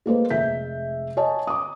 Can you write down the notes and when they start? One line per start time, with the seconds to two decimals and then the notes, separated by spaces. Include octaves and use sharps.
0.06 G#3 A#3 B4 C5
0.30 F1 G#3 E5 G6 B6
1.17 C#5 D#5 G#5 A5
1.47 D6 D#6